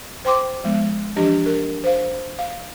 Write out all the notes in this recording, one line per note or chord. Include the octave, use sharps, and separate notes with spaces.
C5 G5 C6 D6
F3 G#3 B3
E3 F3 D4 G4 D#5
A#4
C5 F5
F5